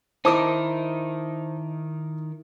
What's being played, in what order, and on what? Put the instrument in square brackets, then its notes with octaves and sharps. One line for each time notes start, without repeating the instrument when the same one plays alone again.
[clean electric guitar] D#3 D#4 [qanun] E4 A#4 D#5 [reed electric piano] C5 [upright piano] A5 D6